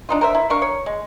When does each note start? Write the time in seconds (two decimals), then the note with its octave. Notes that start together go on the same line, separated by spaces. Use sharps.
0.09 D4 D#4 F4
0.21 A#4 C5 E5
0.35 E4
0.50 D4 A#4 F5 C#6
0.62 C#5
0.86 G#3